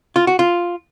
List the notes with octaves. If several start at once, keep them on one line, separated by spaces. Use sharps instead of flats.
F4
F#4
F4